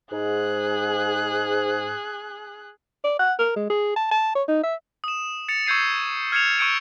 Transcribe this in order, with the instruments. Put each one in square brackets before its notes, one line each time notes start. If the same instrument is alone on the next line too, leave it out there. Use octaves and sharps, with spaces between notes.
[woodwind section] G#2 [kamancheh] G#4 F#6
[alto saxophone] D5
F#5
A#4
G#3
G#4
A5
A5
C#5
D#4
E5
[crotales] D#6 E7
A6 C#7 F7
C#6 E6 G6 G#6 C7 D#7
F6 G#6 C7 C#7 E7 F7
C#6 E6 G6 C#7 D7 E7